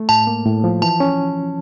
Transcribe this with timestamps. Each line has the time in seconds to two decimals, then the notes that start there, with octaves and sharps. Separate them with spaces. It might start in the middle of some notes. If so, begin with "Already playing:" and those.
Already playing: A3
0.09 A2 A5
0.27 A#3
0.46 A2
0.64 F3
0.82 E3 A5
1.00 C#4